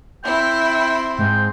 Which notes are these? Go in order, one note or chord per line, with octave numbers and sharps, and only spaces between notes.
C4 E4 G5
G#2 G5